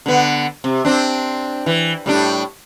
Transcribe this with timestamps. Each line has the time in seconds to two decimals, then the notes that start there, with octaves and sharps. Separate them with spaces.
0.06 D3 B3
0.64 C3
0.85 C4 D4
1.66 E3
2.06 A2 G3 D4